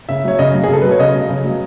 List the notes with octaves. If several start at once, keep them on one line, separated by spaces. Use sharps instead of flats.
C#3 E5
F#3 C#5
C#3 D#5
F#3
G#4
C#3 A4
F#3 B4
C#5
C#3 D#5
F#3
C#3
F#3